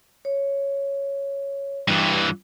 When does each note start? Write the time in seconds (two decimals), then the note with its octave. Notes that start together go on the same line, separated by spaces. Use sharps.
0.25 C#5
1.88 G2 E3